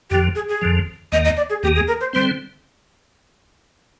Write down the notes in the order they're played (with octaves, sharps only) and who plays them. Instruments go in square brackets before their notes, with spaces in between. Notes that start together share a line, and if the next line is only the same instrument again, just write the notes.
[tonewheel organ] F2 D3 F3 [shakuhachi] G4
[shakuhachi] G#4
G#4
[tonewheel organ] F2 D3 F3
[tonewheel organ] D#2 D#3 A#3 [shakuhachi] D#5
[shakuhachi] D#5
D5
G#4
[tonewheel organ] D#2 D#3 A#3 [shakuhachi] G4
[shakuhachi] G#4
A#4
C5
[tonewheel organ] D3 G3 C4 [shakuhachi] C5